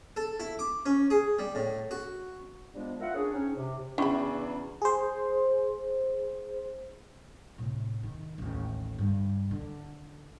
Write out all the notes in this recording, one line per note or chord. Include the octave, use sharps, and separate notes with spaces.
A4
E4
D6
C#4
G#4
G3
A2
F#4
F3 G3 G#3 B3 D4
E4 F4 A#4 E5 F#5
C#4 D4 G#4
C4 C#4 D#4 C#5
C3
E2 C#3 C#4 D4 E4 F#4 B5 C#6
G#4 C5
A2 C3
D#3
A1 D#2
G2 D3
D3